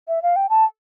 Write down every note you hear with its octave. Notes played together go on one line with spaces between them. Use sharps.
E5
F5
G5
A5